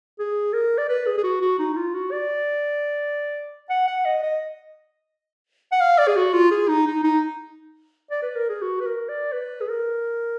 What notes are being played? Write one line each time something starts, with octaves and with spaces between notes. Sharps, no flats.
G#4
A#4
D5
B4
G#4
G#4
F#4
F#4
D#4
D#4
F4
F#4
D5
F#5
F#5
D#5
D#5
F#5
F5
D5
G#4
F#4
F4
G#4
D#4
D#4
D#4
D5
B4
A#4
G#4
F#4
B4
A#4
D5
B4
G#4
A#4